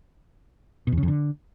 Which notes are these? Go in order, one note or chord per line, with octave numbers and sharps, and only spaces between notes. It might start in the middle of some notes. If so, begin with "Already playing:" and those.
B2
E2
C#3
F2
D3